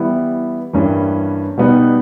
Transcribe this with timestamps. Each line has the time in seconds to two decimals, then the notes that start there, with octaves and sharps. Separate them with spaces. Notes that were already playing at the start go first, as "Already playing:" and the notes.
Already playing: E3 G3 B3 E4
0.73 G2 E3 G3 A#3 C#4
1.58 B2 G3 B3 D#4